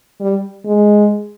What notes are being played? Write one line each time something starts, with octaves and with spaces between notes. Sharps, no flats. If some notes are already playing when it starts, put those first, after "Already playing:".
G3
G#3